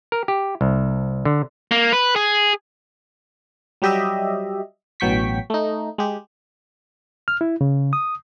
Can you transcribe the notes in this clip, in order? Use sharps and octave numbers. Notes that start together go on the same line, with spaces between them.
A#4
G4
C2
D3
A#3
B4
G#4
F#3 G3 G4 D#5 E5
A1 B2 F#3 G5 C#6 B6
A3 D#4
G#3 G4
F6
E4
C#3
D#6